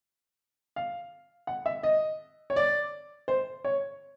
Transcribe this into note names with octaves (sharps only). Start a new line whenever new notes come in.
F5
F#5
E5
D#5
C#5
D5
C5
C#5